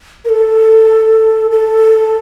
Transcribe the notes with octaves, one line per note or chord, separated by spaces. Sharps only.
A#4
A4
A4